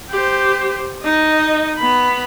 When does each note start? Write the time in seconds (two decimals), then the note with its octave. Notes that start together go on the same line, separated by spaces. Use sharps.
0.10 G4 C5
1.03 D#4 D#5
1.78 B3 B5